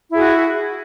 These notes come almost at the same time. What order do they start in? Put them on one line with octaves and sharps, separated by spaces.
E4 G#4 F#4